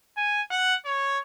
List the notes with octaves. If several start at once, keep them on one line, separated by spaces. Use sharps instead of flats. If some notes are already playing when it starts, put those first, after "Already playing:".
G#5
F#5
C#5